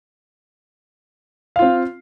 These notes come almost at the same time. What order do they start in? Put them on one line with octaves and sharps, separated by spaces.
F5 F4 C4